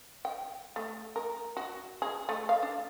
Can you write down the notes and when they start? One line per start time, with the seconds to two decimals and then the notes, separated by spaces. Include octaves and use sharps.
0.25 G5
0.76 A3
1.16 A#4
1.57 F#4
2.02 G#4
2.29 A3
2.49 F5
2.63 D4